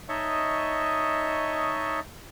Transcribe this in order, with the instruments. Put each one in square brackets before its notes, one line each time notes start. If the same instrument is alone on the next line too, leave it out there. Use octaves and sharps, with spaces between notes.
[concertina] D#4 C#5 D#5 E5 A5 C#6